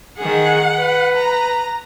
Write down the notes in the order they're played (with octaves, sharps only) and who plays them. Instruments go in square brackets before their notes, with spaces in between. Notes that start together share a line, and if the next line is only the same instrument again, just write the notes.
[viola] D#3 G#4 [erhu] F#5
[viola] B4
[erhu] A#5